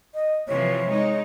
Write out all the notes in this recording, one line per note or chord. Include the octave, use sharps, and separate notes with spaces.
D#5
C3 E3 F3 C#5
G#3 D#4